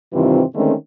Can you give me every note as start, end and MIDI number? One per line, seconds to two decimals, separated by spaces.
0.14 0.42 43
0.14 0.42 48
0.14 0.42 51
0.14 0.42 52
0.14 0.42 60
0.14 0.42 65
0.55 0.73 50
0.55 0.73 51
0.55 0.73 56
0.55 0.73 57
0.55 0.73 60
0.55 0.73 61